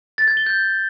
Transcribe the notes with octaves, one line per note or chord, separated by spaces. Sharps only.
A6
G#6
G7
G6